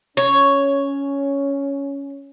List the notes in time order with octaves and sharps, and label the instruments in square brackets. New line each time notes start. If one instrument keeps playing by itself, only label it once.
[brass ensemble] C#4 [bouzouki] C#5